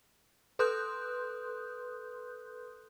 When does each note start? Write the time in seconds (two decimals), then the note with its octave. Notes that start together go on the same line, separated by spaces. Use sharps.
0.59 A4 B4 C6 D#6 F#6 G6